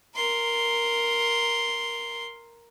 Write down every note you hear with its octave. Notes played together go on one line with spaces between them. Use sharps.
A#4 C6